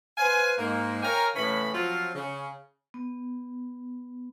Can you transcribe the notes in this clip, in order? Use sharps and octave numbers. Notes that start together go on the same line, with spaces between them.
B4 C5 F5 G#5
G#2 A#3
A#4 C#5 F5 G5 G#5 A#5
A2 C#3 E3 C#4 B5
F3 F#3 C4 F4
C#3
B3